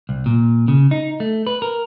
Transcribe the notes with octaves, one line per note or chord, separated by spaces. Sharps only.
C2
A#2
C#3
D#4
A3
B4
A#4